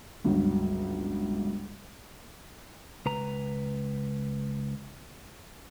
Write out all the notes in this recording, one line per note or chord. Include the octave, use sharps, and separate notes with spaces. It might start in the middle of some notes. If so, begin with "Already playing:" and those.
G1 C#2 F#3
C#2 B4 A#5